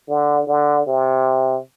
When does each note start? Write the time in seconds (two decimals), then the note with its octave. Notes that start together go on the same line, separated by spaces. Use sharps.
0.08 D3
0.47 D3
0.87 C3